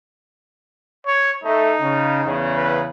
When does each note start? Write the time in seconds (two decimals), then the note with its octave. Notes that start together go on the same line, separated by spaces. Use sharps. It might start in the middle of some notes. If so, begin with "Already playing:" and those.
1.06 C#5
1.44 A3 D#4
1.81 C#3
2.25 E2 C#3
2.57 B4